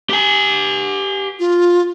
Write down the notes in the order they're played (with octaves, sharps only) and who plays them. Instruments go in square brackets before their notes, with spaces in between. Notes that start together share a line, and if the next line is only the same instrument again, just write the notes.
[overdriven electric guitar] G4 G#5
[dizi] F4